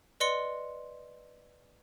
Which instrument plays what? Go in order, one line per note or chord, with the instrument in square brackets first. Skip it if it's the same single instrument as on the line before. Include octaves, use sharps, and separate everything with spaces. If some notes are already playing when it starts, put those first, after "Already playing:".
[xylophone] B4 D5 D#5 C6 C#7 G7